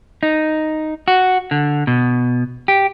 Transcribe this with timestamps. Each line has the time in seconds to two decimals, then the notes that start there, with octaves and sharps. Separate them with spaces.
0.23 D#4
1.08 F#4
1.51 D3
1.87 B2
2.68 G4